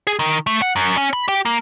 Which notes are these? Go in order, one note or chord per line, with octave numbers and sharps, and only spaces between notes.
G#4
D#3
A3
F#5
F#2
C#4
B5
G4
A#3